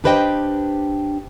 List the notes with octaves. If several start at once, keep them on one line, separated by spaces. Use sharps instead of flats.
D4 G4 B4 C5 D#5 G5